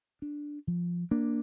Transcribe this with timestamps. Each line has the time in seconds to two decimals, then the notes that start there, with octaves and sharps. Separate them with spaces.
0.22 D4
0.67 F3
1.11 A#3 D4